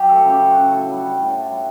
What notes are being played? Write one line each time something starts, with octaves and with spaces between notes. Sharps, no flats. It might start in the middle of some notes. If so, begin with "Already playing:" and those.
Already playing: F#3 G4
A3 A4
C#3
G4
F#3
C#3 F#4
A2
G3
G3
A2
A2
G3